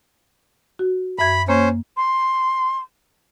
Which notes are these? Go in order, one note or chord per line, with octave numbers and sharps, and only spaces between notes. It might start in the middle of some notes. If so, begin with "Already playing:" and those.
F#4
F#2 E5 B5 G#6
A#3 C#4 C5
C6